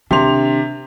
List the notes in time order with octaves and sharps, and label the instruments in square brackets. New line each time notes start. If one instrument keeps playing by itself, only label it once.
[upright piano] C3 C6 F7 [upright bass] D#3 D4